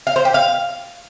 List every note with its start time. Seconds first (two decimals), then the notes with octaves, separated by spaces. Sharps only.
0.07 F5
0.16 C5
0.25 G4
0.34 F5